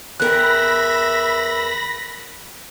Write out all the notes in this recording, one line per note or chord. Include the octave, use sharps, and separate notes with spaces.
E2 A#4 E5 G5 B5 F#6 A#6